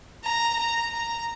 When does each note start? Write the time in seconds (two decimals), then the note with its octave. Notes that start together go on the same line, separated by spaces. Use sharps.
0.24 A#5
0.59 A#5
0.92 A#5